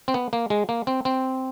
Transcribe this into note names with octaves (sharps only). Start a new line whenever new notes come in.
C4
B3
A#3
G#3
A#3
C4
C4